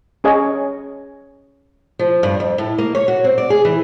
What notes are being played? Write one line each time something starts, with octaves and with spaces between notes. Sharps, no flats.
C#4 G#4 C#5 D#5 G#5
F3
G2
F2
A2
A#3
C#5
F#4
C4
D5
G#4
E3